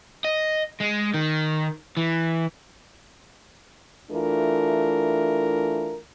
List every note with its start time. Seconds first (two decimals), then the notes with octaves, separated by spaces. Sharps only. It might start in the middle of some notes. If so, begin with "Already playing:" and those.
0.25 D#5
0.81 G#3
1.14 D#3
1.97 E3
4.11 E3 A3 D4 F4 A#4